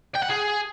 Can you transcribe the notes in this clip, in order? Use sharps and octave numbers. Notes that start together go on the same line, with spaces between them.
G5
F#5
G#4